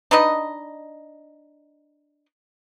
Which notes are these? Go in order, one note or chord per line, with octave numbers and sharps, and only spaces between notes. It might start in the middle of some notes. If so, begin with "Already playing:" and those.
D4 D#4 B4 D#5